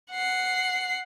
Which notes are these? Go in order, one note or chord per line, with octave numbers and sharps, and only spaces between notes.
F#5 C7